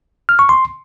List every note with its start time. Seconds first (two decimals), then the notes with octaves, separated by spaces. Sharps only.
0.29 F6
0.39 C#6
0.49 C6